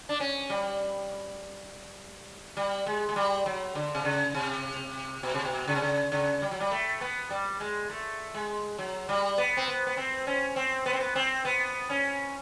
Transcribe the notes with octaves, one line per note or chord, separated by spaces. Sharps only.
D4
C#4
G3
G3
G#3
G#3
G3
F#3
D3
C3
C#3
C3
B2
C3
B2
C#3
C3
C#3
C#3
G3
F#3
G3
A3
B3
G3
G#3
A3
G#3
F#3
G3
B3
C4
B3
B3
C4
C#4
C4
B3
C4
B3
C4
B3
C#4